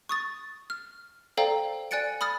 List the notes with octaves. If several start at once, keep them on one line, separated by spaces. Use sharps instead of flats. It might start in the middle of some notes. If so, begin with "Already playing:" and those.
C#6 D#6 A6
F6
A4 C5 D5 F5 G5 A#5
D5 G#5 F#6 A6 C#7 D7
B5 D#6 F6 A6